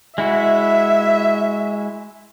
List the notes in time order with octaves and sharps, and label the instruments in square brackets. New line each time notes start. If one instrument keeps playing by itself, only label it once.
[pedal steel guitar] G#3 E4 F#4 [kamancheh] E5